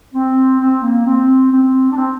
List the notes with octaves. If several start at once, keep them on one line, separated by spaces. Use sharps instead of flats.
C4
C4
A#3
C4
C4
D4
C4